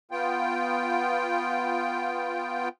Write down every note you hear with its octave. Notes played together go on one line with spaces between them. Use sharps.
B3 F4 G5